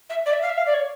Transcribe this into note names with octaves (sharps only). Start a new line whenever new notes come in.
E5
D5
E5
F5
E5
F5
D5
C#5